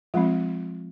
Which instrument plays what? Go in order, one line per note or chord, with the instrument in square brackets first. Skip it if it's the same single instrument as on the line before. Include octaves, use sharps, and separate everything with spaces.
[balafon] F3 G#3 C4 F4